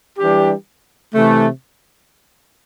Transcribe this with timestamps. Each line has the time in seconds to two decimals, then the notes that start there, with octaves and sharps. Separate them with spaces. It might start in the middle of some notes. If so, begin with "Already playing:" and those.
0.19 E3 G3 D4 G4
1.15 C3 E3 A3